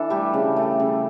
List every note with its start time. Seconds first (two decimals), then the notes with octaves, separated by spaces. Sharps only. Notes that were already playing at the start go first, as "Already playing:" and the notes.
Already playing: E3 D4 A4
0.10 G3 A3 G4
0.34 C#3
0.56 A3
0.80 C#3